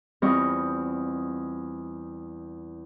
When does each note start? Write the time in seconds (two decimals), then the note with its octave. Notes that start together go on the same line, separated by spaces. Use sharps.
0.22 E2 G3 C4 F4 D#5 C#6